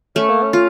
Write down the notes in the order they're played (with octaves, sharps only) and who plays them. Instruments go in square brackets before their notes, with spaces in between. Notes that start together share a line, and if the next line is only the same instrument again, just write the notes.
[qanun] A3 [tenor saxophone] C#4
[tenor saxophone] A#3
C#4
[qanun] F4